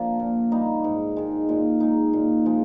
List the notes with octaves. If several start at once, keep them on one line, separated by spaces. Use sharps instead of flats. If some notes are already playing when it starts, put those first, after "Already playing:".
Already playing: D3 F3 A#3 D4
A#2
G3 A#3 D#4
G#2
D#3 G#3
A#2
G#3 D#4
A#2
F3 G#3